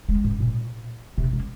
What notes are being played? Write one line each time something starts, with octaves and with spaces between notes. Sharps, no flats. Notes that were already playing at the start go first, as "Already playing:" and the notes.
G#3
G#2
A#2
C3
A#3